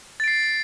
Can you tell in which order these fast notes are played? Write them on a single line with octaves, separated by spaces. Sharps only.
A6 D7 C7